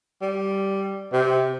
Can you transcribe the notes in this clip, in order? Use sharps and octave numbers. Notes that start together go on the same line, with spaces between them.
G3
C3